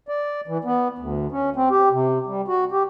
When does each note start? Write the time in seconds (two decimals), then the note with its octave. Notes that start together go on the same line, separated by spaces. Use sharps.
0.08 D5
0.47 E3
0.64 B3
0.98 D2
1.32 C#4
1.56 C4
1.71 G4
1.92 C3
2.26 G3
2.48 F#4
2.71 G4